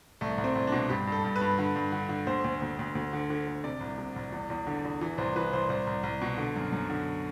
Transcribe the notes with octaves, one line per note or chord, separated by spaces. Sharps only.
C2 A3
C2
C4
C2
B2 D4
G2 G4
G2 A4
G2
B4
G2
D3
G2
D3
D3
D2 C5
D2
D2
D2
D2
D3
D3
D2
C3 D5
C2
C3
C2
E2
E2
D3
E2
E3
C2 C5
E3 B4
C2 C5
C2 C5
C2
C2
B2
D3
F#2
F#2
D3